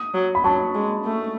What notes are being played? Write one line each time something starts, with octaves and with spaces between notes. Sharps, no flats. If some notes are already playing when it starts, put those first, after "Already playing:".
Already playing: D#6
F#3
B5
F#3 A5 C#6
G#3
A3